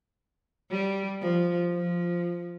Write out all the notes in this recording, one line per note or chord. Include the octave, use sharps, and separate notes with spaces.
G3
F3
F3